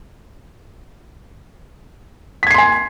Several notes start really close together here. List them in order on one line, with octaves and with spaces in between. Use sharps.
B6 G#6 C7 C6 G#5